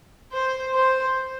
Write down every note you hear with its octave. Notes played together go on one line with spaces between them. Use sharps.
C5
C5